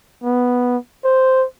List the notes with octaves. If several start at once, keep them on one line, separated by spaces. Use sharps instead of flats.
B3
C5